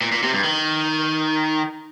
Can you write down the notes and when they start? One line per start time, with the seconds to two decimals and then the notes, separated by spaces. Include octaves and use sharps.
0.01 A#2
0.12 A#2
0.23 C3
0.33 G2
0.44 D#3